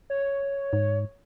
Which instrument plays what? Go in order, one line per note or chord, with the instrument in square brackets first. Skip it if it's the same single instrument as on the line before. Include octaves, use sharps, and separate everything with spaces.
[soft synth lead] C#5
[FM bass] G#2